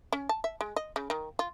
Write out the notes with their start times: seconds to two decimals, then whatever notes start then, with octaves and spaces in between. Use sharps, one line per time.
0.13 C#4
0.29 A5
0.44 E5
0.61 G#3
0.76 D#5
0.96 C#3
1.10 D#3
1.39 F4